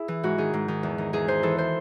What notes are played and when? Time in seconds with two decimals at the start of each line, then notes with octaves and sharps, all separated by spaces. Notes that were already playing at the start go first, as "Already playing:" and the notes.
Already playing: E4 G#4
0.08 E3
0.23 G#2 F#4
0.38 D#3 G#4
0.53 G#2
0.68 D#3
0.83 E2
0.98 D#3
1.13 E2 G#4
1.28 D#3 C5
1.43 E3 A4
1.58 C5